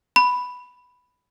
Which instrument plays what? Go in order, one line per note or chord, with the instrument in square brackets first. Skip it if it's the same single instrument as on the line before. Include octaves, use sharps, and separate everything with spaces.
[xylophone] B5